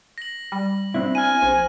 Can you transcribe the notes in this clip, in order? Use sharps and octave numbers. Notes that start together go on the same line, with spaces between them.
A#6 F#7
G3
C4 D4 E4
G#5 F6 D#7
A#1 C5